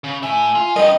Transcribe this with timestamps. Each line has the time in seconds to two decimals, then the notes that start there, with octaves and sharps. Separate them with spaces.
0.04 C#3
0.22 A2 E5 G#5
0.55 F4
0.76 G2 D#4 A#4 D#5 G5